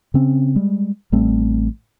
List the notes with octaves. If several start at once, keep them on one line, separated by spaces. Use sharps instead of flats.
C#3 C4 C#4
G3 G#3
A1 G3 A3 C4